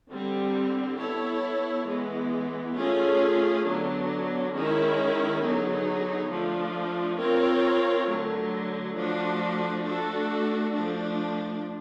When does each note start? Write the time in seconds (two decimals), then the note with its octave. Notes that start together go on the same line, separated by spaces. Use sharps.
0.11 D3 G3 C4
0.99 B3 E4 A4 C#5
1.87 E3 G#3 B3
2.76 A3 C#4 F4 G#4
3.65 D3 F#3 B3 D4
4.53 D#3 G#3 C#4 E4
5.42 D3 F#3 B3 D#4 G#4
6.31 F3 A3 D4 F4
7.19 C4 F4 A#4 C#5
8.08 D3 F#3 A3
8.96 F3 A3 D4 F#4
9.85 A3 D4 F#4 A4
10.74 F3 A3 D4